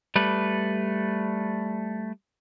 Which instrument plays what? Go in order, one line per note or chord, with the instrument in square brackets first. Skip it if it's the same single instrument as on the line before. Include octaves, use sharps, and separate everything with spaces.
[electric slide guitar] G3 A3 B4